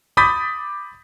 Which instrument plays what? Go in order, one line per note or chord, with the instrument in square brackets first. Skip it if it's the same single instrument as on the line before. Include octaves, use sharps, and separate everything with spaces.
[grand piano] B5 D6 D#6 G6 A6 B6